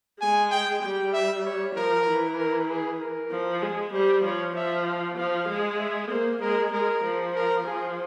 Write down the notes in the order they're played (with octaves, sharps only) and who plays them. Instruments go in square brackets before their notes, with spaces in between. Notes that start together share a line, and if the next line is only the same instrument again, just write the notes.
[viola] G#3 [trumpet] G#5
[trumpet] G5
[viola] G3 [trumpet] G5
[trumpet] E5
C#5
[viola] F3 [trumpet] A#4
[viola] E3
[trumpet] A#4
G#4
A#4
[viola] F3
[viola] G#3 [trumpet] G#4
[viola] G3 [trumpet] C5
[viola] F3 [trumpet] C#5
[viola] F3 [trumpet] E5
[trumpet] F5
[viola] F3 [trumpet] F5
[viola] G#3
[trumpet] E5
[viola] A#3 [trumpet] C5
[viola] G#3 [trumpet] A#4
[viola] G#3 [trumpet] A#4
[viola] F3
[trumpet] A#4
[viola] F3 [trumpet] G#4